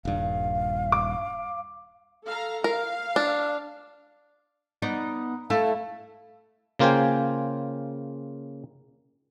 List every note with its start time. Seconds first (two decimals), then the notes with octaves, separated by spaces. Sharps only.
0.05 D#1 G2 F5
0.92 D6
2.24 A4 F5 A#5
2.64 A#4 F5
3.16 D4
4.82 B3 D#4 D5
5.50 A3 E4 A4 F5
6.79 C#3 A#3 F4 C5 G5 G#5